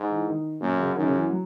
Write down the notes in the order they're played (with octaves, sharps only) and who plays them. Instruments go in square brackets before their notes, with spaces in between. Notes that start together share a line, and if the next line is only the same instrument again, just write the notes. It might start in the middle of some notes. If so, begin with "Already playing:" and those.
Already playing: [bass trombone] G#2
[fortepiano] E3
D#3
[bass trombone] F#2 [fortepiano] A#2
[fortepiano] C#3
[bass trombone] F#2 [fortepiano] D#3
[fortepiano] C#3
E3
F#3